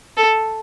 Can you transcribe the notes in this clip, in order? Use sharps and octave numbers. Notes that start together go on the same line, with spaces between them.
A4